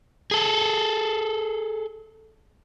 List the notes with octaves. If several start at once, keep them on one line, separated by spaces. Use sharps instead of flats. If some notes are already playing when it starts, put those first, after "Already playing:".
G#4 A4